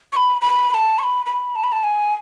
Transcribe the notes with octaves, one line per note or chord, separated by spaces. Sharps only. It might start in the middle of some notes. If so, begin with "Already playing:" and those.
C#6
B5
B5
B5
A5
C#6
B5
B5
A5
B5
A5
G#5